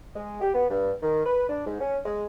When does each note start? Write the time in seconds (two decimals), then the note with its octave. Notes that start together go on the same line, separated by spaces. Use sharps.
0.15 G#3
0.41 G4
0.54 B3
0.71 G2
1.02 D#3
1.25 B4
1.49 D4
1.66 G#2
1.81 C#4
2.05 G#3